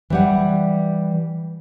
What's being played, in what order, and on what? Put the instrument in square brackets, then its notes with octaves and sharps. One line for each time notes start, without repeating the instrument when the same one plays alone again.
[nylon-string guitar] E3 G3 F#5